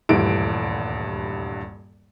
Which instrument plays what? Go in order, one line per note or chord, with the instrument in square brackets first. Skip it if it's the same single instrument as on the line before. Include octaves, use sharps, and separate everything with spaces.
[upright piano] D#1 D2 G2 E3 D7